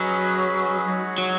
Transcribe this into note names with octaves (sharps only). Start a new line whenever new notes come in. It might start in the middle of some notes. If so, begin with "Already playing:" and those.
Already playing: F#3 C#4 G#4 B4 D#5
G#3 D#4 F#4 C#5 F#5
F#3